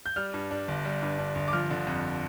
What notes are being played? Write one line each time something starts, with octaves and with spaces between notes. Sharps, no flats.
G6
G3 F6
G2
D4
G1
G3
G2
D4
G1
D6
F3 F6
D3
F2